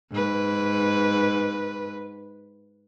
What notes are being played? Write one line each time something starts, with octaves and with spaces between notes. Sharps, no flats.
G#2 B4